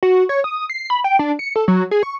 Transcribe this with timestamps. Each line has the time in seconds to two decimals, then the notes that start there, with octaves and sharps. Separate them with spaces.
0.03 F#4
0.29 C#5
0.44 D#6
0.70 C7
0.90 B5
1.04 G5
1.19 D4
1.39 C#7
1.56 A4
1.68 F#3
1.91 G#4
2.03 C#6